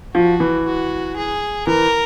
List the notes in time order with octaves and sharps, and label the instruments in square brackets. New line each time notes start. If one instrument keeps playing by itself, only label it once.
[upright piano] F3 [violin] F#4
[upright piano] E3
[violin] F#4
G#4
[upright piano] E3 [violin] A#4